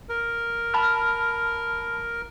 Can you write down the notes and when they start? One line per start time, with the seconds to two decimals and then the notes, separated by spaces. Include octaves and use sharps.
0.09 A#4
0.74 A5 B5 F6